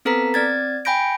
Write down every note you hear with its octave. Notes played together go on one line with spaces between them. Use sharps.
B3 C4 A4 B4 A#5 B6
C4 D5 G#6 A6
G5 G#5 B5 G6 A#6 D7